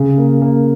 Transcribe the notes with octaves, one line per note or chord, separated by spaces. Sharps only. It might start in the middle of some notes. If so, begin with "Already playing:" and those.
Already playing: C#3
A#3
A#3